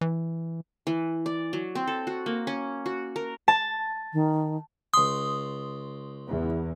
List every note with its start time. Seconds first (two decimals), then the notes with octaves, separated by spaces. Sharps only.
0.01 E3
0.87 E3
1.26 D5
1.53 F#3
1.75 C4
1.87 A4
2.07 F#4
2.26 A#3
2.47 C#4
2.86 F#4
3.16 A#4
3.48 A5
4.13 D#3
4.94 C#2 C6 D#6
6.28 E2